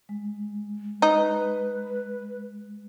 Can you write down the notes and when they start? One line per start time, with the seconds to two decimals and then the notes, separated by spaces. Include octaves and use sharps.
0.09 G#3
1.02 D#4 B4